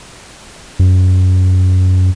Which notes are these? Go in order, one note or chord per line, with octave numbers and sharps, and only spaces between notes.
F#2